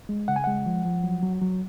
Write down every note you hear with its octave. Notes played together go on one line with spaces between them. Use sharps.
G#3
C#3 F#5
G#5
G#3 F#5
F3
F3
F#3
F#3
F#3